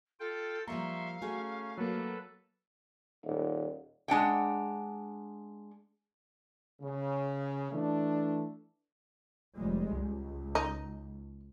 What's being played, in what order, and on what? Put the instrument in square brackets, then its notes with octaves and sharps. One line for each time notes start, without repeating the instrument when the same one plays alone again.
[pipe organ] F4 G5 [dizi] A4
[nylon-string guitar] F3 G3 A#3 [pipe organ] E5 C6 C#6 [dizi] F5 [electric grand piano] A#5
[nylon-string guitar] A3 F#4 G#4 [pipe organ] C#4
[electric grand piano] F#3 A#3 [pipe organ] A4 B4
[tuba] D#1
[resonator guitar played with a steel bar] G#3 D4 F#5 G5
[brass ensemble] C#3
E3 A3 D4
[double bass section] F1 G3 G#3
C#2
[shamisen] D#4